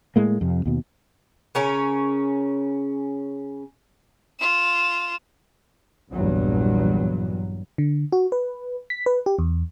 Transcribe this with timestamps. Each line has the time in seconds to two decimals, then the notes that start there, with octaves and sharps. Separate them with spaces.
0.16 A2 G#3 A#3
0.41 F2 C3
0.66 D#2 B2
1.55 C#3 C#4 A#4
4.40 F4 E7
6.11 A#1 E2 G2 F#3
7.78 D3
8.12 F#4
8.32 B4
8.90 B6
9.06 B4
9.26 G4
9.39 E2